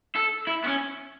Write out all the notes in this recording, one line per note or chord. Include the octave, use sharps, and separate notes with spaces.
A4
E4
B3
C#4